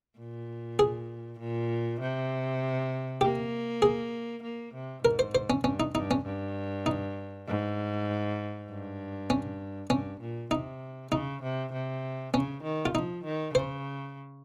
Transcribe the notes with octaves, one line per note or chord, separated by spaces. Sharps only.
A#2
G#4
A#2
C3
A#3 G4
G#4
A#3
C3
G#2 A#4
C5
C5
C#4
G2 C#4
D#4
G2 D#4
C#4
G2
D#4
G#2
G2
C#4
G2 C#4
A#2
C3 D#4
C#3 D#4
C3
C3
C#3 C#4
D#3
F4
F3 D#4
D#3
C#3 C5